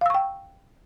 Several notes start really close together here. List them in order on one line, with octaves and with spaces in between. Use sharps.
F5 E6 C#6 G5